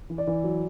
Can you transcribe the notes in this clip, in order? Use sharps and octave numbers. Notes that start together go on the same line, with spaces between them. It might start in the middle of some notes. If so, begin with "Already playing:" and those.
E3
D5
E3
F#3